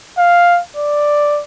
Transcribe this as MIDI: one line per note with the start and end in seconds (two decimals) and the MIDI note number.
0.18 0.60 77
0.77 1.41 74